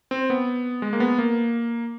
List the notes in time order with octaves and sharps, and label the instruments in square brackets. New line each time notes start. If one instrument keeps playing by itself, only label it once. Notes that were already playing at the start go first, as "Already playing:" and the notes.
[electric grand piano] C4
B3
G#3
A#3
B3
A#3